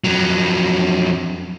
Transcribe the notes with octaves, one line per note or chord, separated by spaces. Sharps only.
F2 F#3